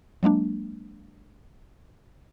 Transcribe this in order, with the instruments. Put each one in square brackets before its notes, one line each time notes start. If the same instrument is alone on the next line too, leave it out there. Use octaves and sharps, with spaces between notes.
[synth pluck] F#3 G#3 A#3 D4